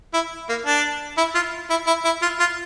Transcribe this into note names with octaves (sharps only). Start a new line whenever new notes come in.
E4
A#3
D4
E4
F4
E4
E4
E4
F4
F4